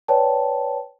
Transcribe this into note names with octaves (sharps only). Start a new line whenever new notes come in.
B4 C#5 D5 G5 A5